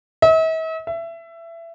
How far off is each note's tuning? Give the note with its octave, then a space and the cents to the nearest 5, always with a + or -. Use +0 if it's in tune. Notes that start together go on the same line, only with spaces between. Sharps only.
E5 -45
E5 +20